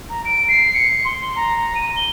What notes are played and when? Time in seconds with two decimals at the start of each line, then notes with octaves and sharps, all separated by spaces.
0.09 A#5
0.25 D7
0.48 C7
0.74 C#7
1.04 C6
1.36 A#5
1.75 D#7
1.96 G7